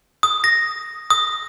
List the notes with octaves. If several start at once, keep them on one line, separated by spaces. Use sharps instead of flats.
D#6
A#6
D#6